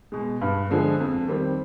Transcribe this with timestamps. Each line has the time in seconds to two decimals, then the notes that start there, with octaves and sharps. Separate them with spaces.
0.12 B2 G#3
0.41 G2
0.70 D3 F3 G#3 D4
1.00 F2
1.28 D#3 G3 C4